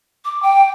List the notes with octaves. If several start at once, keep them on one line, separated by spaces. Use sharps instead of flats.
D6
G5